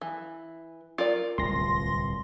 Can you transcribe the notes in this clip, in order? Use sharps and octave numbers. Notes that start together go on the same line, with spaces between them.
E3
F4 A#4 D5
D1 C2 C6 A#6